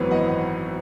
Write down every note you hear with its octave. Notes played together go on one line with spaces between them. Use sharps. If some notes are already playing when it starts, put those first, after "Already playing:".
Already playing: G#1 F#2 E3 B3
D#5 F#5